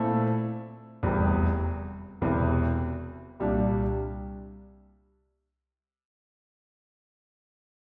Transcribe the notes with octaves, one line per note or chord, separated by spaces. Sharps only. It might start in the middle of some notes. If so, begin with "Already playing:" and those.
Already playing: A#2 A3 C4 E4 A4
F1 E2 C3 G3
E1 E2 C3 E3
C2 A#2 G3 D4